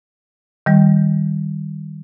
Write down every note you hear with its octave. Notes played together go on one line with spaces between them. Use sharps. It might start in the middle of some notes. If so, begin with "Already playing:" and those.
D#3 G3